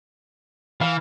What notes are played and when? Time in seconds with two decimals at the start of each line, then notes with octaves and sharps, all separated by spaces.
0.81 E3 F5